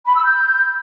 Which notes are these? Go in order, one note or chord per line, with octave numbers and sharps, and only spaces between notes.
B5
E6
G6